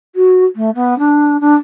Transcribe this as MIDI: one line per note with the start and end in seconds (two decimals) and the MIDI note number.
0.15 0.44 66
0.56 0.70 57
0.75 0.97 59
0.98 1.39 62
1.41 1.55 62